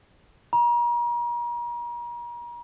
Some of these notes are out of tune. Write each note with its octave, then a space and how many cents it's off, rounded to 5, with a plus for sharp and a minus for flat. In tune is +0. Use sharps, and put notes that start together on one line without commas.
A#5 +40